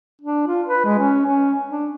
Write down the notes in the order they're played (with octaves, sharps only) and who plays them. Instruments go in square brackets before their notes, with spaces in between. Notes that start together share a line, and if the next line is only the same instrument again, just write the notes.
[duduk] D4
F4
B4
G#3
C#4
C#4
D4